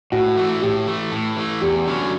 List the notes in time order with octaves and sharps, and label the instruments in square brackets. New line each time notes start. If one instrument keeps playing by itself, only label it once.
[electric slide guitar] A2 [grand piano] F#4
[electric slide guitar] E3 A3
[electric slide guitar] A2 [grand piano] G4
[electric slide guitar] E3 A3
A2
E3 A3
[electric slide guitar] E2 [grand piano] G4
[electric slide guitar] D3 F#3 C#4